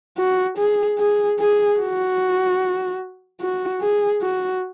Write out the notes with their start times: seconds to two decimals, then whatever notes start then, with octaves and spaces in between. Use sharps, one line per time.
0.18 F#4
0.58 G#4
0.99 G#4
1.39 G#4
1.80 F#4
3.41 F#4
3.81 G#4
4.22 F#4